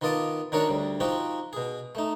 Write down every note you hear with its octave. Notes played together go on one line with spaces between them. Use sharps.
D#3 B3 F4 D#5 A5 D6
D#3 D4 D#4 F#4 A#4 C#5
D2 G3
F3 C4 D#4 F#4 G4
B2 G#4
A3 D#4